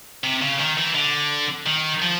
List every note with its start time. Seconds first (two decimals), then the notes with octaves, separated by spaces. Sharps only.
0.23 C3
0.42 C#3
0.59 D#3
0.77 E3
0.95 D3
1.66 D#3
2.02 F3